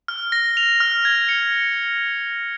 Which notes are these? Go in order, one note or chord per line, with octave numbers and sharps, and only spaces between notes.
F6
A#6
F7
F6
G#6
C#7